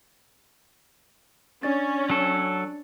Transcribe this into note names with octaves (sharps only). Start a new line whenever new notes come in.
C#4 D4 D5 A6
F#3 A4